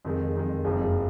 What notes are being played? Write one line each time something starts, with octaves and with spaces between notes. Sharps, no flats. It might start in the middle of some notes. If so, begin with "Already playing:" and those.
F2 D#3 G#3
F2 D#3 G#3
F#1 F2 F3 G#3